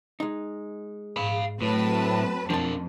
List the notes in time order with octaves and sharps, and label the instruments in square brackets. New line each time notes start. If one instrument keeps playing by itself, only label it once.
[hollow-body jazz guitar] G#3 D#4
[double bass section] G#2 [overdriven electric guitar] F5 B5
[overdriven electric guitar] A2 [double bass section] F#3 A3 C4 [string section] B4 A5
[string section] F2 [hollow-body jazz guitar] F3 A5 [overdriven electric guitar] D4 A#4